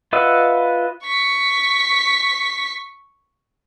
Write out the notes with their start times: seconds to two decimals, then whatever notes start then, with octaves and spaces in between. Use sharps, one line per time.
0.13 F4 B4 D#5 E5 F#5
1.05 C#6 B6